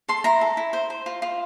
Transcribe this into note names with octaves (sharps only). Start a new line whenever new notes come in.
A4 C6
E4 A#5
A4
E4
C5
C5
F4
F4